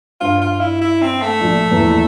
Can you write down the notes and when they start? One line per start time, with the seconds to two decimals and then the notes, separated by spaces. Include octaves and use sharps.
0.21 G2 F4
0.41 F4
0.61 E4
0.81 E4
1.02 C4
1.22 A3
1.41 A#1 A#2
1.71 E2 E3